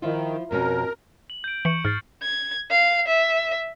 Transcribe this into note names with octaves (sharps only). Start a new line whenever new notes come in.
D#3 F3 E4 F4
F2 B2 C#4 A#4
F#7
G6 D7
E3 C#6 C#7 F#7
G#2 F6 A6 C7
G#6
F5
E5